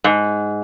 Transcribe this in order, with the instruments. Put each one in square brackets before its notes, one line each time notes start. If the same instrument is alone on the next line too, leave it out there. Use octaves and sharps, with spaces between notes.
[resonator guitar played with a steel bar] G#2